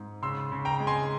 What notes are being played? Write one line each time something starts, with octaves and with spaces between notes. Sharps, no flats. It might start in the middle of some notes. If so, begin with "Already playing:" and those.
Already playing: G#2
C#3 C6 E6
C#3
G5 A#5
G#3
G#5 C6